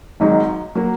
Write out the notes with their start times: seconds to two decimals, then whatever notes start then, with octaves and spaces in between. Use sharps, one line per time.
0.20 G#1 G#2 F#3 D#4
0.75 F#3 A#3